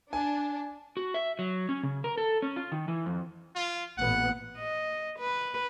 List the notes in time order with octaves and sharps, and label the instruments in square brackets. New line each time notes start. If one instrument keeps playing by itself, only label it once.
[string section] D4 [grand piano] G#5
[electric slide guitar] F#4
E5
F#3
C#4
C#3
A#4
A4
C#4
F4
D#3
E3
F2
[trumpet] F4
[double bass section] A1 A#2 B3 [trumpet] F#5
[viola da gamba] D#5
B4